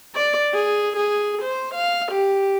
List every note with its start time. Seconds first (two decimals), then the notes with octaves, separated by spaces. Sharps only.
0.15 D5
0.53 G#4
0.96 G#4
1.42 C5
1.74 F5
2.11 G4